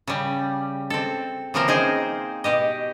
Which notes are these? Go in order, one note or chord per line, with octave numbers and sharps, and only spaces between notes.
C#3 G3
C4 A4
C#3 E3 F3 A#3 C4 A#4
D#4 G#4 C5
B2 G4 D#5